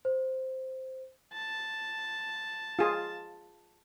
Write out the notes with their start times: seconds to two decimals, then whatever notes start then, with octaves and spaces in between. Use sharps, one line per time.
0.05 C5
1.33 A5
2.79 F4 G#4